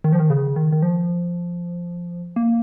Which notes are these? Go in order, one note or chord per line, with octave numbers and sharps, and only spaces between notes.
D#3
F3
D#3
C#3
D#3
D#3
F3
A#3